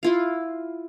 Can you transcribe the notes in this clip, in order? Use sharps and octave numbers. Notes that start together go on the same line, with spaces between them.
E4 F4 F5